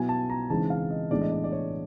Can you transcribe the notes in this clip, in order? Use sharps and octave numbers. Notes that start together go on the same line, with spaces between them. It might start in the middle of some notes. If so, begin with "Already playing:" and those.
Already playing: B2 F#3 B3 E4 G#5
A5
A#5
C#3 E3 G#3 C4 D#4 A5
F5
D#5
A2 E3 G#3 B3 D4 D5
D#5
D5
D5
C#5